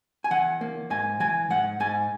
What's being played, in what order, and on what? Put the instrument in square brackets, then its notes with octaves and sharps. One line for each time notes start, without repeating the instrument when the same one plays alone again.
[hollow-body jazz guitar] G#5
E3 F#5
A#3
G#2 G#5
E3 G#5
G#2 F#5
G#2 G#5